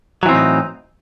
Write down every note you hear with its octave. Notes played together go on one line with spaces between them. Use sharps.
A2 E3 F#3 C4 D#4